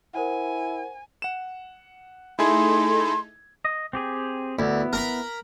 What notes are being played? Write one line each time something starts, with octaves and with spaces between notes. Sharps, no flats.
E4 A#4 C5 F#5 G#5
F#5 E7
A3 D#4 E4 G#4 A4 C6 G#6
D#5
C4 G4 G#4
D2 B3 E4
A#4 A#5 B5